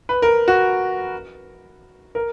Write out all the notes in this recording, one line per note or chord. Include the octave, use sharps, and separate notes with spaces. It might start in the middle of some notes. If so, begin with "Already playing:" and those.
B4
A#4
F#4
A#4